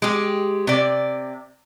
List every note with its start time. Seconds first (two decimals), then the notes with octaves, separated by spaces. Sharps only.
0.02 G#3 G4
0.67 C3 D5